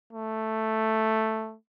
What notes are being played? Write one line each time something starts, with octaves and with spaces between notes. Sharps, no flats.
A3